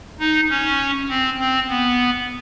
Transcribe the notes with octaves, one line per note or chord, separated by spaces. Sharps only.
D#4
C#4
C4
C4
B3